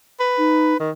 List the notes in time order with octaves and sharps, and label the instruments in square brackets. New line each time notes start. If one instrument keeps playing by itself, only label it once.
[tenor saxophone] B4
[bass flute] D#4
[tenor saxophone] D#3